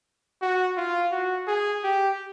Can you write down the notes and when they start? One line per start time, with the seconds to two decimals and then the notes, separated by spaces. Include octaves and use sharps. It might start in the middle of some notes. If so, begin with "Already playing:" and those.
0.42 F#4
0.77 F4
1.12 F#4
1.47 G#4
1.83 G4